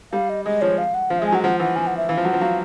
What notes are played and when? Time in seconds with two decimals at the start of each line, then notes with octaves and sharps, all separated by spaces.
0.13 G3 F5
0.30 D#5
0.45 G#3 D#5
0.61 F3 C#5
0.78 F5
0.94 F#5
1.10 F3 F5
1.19 G#3 E5
1.27 G#5
1.32 F#3 F#5
1.43 F3 F#5
1.60 E3 F#5
1.76 F3 G#5
1.87 F#5
1.97 E5
2.09 E3 F5
2.17 F3
2.25 F#3 F#5
2.33 F3
2.41 F#3 F5